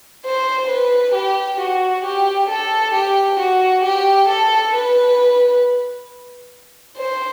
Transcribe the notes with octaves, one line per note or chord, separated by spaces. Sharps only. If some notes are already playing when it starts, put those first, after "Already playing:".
C5
B4
G4
F#4
G4
A4
G4
F#4
G4
A4
B4
C5